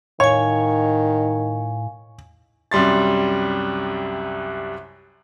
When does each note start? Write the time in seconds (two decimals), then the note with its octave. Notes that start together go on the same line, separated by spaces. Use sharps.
0.20 A2 D#3 C#5 F5 G#5
2.72 C2 F#2 G3 C6 A6